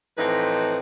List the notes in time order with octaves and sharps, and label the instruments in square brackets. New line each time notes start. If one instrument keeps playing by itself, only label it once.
[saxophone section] A2 E3 F3 C4 D#4 B4